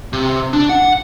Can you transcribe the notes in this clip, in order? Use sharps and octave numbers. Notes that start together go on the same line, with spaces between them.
C3
D4
F#5